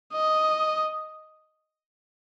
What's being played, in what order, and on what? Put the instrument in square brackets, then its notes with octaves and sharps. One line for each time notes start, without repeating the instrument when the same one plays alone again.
[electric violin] D#5